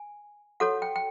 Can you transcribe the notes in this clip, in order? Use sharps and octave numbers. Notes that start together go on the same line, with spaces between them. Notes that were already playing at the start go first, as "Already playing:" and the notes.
Already playing: G#5
F#4 A4 C#5 F#5
G5
G5